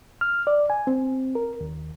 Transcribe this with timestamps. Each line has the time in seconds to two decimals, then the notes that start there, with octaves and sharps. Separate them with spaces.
0.21 F6
0.47 D5
0.70 G#5
0.87 C4
1.35 A#4
1.61 D#2